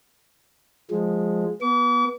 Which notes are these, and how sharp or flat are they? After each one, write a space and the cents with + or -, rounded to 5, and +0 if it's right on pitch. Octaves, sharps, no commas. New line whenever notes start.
F3 +15 G#3 +0
B3 -20 D6 -45